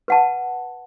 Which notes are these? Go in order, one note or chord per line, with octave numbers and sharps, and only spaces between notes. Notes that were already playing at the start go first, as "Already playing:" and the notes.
B4 F#5 A5